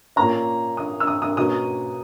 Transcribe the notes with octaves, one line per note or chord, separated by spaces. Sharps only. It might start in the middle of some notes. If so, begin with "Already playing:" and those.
A#2 A#3 C#4 A#5
D#6
E6
D#6
D#6
B2 A#3 C#4 D#6